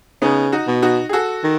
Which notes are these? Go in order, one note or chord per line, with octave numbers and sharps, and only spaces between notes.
C#3 B3 D#4
D#4 F#4
B2
D#4 F#4
G#4
F#4 A4
D#3